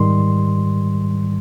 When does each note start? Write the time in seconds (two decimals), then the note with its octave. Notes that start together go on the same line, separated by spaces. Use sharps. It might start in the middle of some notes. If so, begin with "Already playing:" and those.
Already playing: G#2 D#3 G3 C6